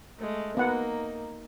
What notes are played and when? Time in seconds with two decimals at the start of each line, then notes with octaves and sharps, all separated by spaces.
0.19 G#3 A3
0.57 A#3 B3 D#4 F#5